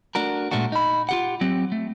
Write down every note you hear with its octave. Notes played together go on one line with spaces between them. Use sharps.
A3 D4 F#4 A#4
A#2 G#3 A3 D4 F#4
D#4 B5
F4 G4 F#5
F#3 C4 G4
A3